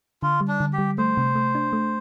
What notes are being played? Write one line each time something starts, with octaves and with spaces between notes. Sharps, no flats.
D3 F4
G3
D4
D3
G4
G3
A3 C5
C3
A3
D4
A3